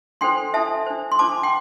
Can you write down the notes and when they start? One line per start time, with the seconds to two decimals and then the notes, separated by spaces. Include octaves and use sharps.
0.21 D4 A4 C5 G5 C6
0.53 D4 A4 C5 E5 A5
0.87 D4 C5
1.12 C6
1.19 D4 C5 A5 D6
1.43 G5 C6